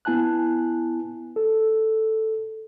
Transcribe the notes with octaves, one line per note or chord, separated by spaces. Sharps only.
B3 E4 G#5 A5 F#6
A4